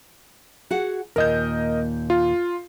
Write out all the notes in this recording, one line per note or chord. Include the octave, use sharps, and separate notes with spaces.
F#4 G#4 F#5
D#2 A#2 A#4 D#5 G6
F4